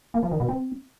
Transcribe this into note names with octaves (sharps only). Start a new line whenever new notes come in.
A#3
F3
D#3
B2
C4